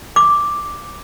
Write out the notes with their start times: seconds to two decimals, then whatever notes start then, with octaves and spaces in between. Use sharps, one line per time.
0.16 D6